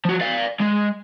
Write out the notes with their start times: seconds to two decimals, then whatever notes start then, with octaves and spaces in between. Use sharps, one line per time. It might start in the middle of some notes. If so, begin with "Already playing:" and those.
0.05 F3 F#4
0.21 D5 F5
0.61 G#3